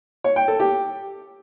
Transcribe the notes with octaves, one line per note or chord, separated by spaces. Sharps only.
C#5
G5
A4
G4